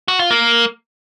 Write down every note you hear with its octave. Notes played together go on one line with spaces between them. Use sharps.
F#4
F4
A#3